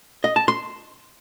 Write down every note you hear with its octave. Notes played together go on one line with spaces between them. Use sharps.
D#5
A5
C6